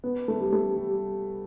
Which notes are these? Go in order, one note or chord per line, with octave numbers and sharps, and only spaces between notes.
B3
A3
G3
A3
G3